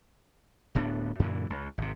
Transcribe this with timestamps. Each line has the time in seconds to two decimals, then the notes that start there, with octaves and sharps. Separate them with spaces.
0.75 D1 A2 B3 D4
1.19 F#2 A#2 D3 E3
1.50 C#2
1.78 G#1 C3